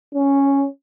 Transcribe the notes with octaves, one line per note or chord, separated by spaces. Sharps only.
C#4